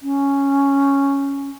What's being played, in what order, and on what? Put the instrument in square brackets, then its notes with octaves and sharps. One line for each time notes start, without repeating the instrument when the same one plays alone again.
[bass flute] C#4